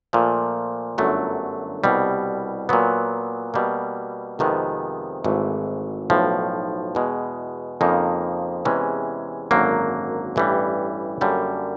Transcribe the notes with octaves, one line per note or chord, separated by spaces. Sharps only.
A#2 F3 A3
G1 F#2 D3 F#3 A3
C2 B2 G3
A#2 F#3 B3
B2 G3 A#3
F2 C3 D#3 G#3 B3
G#1 G#2 E3 A3
B1 A2 F3
E2 B2 G#3
F2 C#3 F3 A#3 D#4
E2 C3 E3 G#3 C#4
G#1 F#2 D3 F#3 A#3
A1 G2 E3 G3
F#2 D3 G3 A#3 C#4